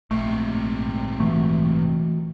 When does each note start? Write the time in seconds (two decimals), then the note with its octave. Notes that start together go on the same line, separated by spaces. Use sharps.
0.11 A#1 G#2 C3 A3
1.20 E3 F#3 A3